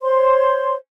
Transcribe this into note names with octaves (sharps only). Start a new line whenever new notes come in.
C5 C#5 C6